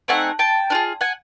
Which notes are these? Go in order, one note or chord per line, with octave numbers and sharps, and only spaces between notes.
A3 C4 D#4 F#5 G#5
G5 A5
D4 F4 G#4
F#5 G#5